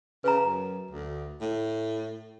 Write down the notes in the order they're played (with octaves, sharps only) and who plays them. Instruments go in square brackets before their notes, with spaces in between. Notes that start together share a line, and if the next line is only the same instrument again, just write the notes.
[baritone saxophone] C#3 [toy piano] B4 A#5
[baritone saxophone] F#2
D2
A2